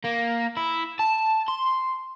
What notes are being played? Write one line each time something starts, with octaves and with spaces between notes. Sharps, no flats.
A#3
E4
A5
C6